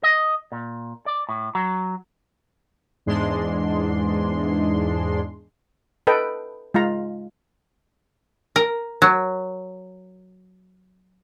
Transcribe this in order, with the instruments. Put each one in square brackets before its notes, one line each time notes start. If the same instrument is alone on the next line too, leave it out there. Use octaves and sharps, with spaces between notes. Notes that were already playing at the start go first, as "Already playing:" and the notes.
[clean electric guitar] D#5
A#2
D5
A2
F#3
[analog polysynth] E2 G#2 G#3 D4 C6
[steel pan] A4 B4 D#5 G5
G#3 F4 F5 A#5
[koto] A#4
F#3